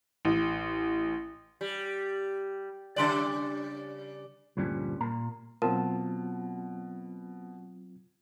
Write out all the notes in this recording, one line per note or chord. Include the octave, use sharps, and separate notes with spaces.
A1
G3
C#3 G3 D5
D2 G2 A#2 F3 G3 C#4
A#2 A#3 A#5
B2 F#3 C4 F4 A#4 A5